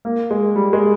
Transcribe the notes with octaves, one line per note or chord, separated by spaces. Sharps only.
A#3
G#3
G3
G#3